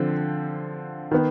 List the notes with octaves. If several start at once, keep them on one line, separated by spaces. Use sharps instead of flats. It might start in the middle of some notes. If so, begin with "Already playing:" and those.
Already playing: D3 F3 C4
D#3 B3